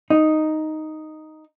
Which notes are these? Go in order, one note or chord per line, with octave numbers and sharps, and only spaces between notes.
D#4